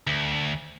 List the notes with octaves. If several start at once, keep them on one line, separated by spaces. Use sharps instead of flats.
D2